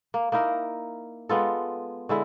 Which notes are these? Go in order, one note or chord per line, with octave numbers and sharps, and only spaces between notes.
A#3
A#3 D#4 E4 A#4
G#3 B3 F4 A4
D3 G#3 E4